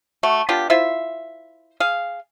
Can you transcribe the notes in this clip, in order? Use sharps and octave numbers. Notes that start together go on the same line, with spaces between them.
A3 F#4
B3 D4 F4 G4
E4 F4 C5 E5
G#4 F5